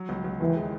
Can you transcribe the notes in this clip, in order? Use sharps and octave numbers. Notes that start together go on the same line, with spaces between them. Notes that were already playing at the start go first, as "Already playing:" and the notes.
Already playing: F#3
C#2
C#2
D#2 E3
G#3